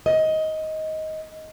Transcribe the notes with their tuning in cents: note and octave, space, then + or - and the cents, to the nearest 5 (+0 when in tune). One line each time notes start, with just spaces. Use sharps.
D#5 +15